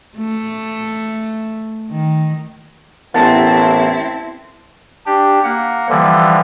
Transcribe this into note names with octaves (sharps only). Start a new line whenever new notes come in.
A3
D#3
A1 B3 C4 E4 G4 A#4 F#5 A5
D4 G4
A#3 F#5
D3 E3 F3 G3